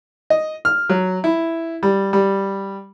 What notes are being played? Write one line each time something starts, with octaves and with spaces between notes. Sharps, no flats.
D#5
F6
F#3
E4
G3
G3